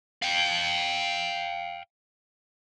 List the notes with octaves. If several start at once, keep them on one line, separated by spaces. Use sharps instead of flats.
F5 G5